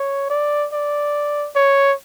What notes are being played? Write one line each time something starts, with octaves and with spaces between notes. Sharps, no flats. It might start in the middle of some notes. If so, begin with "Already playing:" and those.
Already playing: C#5
D5
D5
C#5